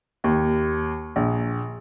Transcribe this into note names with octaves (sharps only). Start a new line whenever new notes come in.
D#2
A#1